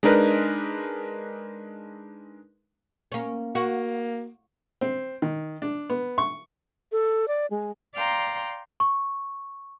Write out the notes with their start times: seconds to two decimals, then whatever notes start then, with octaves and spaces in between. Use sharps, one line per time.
0.03 G#3 D4 D#4 A#4 B4
3.12 A#3 C#4
3.55 A#3 F#4
4.81 C4
5.22 D#3
5.62 D4
5.90 B3
6.18 C#6
6.92 A4
7.28 D5
7.51 G#3
7.94 D5 F5 G5 A#5 C6
8.80 C#6